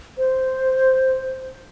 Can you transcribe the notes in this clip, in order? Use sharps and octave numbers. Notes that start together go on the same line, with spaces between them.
C5